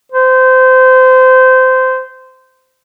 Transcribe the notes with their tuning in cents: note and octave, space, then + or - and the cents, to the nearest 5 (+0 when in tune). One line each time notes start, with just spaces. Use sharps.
C5 -20